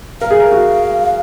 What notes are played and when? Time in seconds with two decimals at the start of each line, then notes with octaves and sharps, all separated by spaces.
0.21 A#4 F5
0.31 G#4
0.40 A#4
0.52 F#4